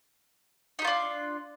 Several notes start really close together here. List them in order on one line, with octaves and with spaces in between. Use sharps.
D#4 G4 F4 D4